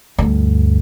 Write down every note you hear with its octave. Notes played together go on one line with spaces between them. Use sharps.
D2 G2